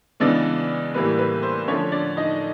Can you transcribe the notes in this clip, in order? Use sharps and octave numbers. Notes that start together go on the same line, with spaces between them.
C#3 E3 G#3 B3 D4 D5
A2 E3 G3 A#3 B4
B4
C5
D3 F3 A3 C#4 C#5
D4 D5
D#4 D#5